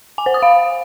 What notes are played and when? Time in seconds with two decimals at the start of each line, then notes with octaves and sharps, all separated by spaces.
0.18 G#5
0.26 C5
0.34 D#6
0.42 F5